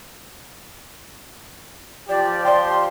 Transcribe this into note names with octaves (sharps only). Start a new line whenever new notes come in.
F3 G4 D5
D5 G5 C6